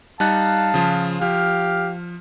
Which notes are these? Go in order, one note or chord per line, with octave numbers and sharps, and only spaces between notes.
G3 D#4 F5 A5 F#6
C#3 F3 F4
F3 G4 F5 F6